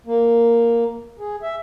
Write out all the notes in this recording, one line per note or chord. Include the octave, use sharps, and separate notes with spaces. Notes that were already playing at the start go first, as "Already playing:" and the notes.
A#3
G#4
E5